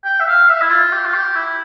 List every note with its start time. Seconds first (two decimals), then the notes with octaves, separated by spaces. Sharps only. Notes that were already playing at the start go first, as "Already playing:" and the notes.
0.05 G5
0.20 E5
0.27 F5
0.49 E5
0.62 E4
0.70 F4
0.92 G4
1.05 F4
1.14 G4
1.35 E4